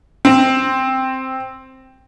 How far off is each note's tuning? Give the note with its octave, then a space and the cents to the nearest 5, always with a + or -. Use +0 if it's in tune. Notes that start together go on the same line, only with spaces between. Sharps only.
C4 +0